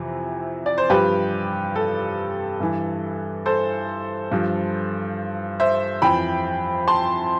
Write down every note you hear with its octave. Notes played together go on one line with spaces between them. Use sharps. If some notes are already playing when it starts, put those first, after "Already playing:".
Already playing: F2 C3 E3
D5
C5
G2 F3 G4 B4
A4
G2 E3
A4 C5
G2 F3
C5 E5
F2 E3 G5 B5
A5 C6